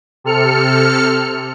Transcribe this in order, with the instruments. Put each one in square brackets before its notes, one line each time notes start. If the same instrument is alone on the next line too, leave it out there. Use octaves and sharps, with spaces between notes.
[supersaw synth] C3 A4 F6 C#7